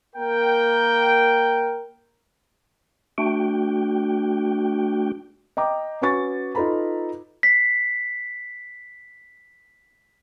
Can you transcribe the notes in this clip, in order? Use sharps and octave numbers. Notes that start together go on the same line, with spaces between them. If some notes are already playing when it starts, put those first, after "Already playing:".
A#3 A#4 G5
A3 D4 F#4 G5
D#5 G5 A#5 D6
C#4 F#4 B4 G#5 C#6 A6
D#4 F4 A4 B4 A#5 B5
B6 C7